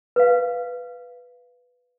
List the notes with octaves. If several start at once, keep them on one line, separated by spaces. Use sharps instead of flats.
B4 F5